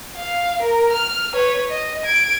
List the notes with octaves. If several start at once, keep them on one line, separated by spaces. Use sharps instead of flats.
F5
A#4
F6
B4 C#5
D#5
G#6 D7